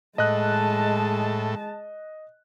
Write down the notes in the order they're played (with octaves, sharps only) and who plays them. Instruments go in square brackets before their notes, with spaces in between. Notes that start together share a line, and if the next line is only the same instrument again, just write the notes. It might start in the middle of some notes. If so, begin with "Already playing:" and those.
[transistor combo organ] A2 [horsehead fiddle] G#3 A5 [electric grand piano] D#5 F#6